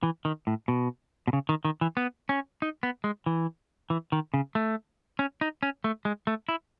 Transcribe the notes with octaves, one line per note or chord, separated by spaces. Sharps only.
E3
D#3
A2
B2
B2
C#3
D#3
D#3
E3
B3
C#4
D#4
B3
G#3
E3
E3
D#3
C#3
A3
C#4
D#4
C#4
A3
G#3
A3
E4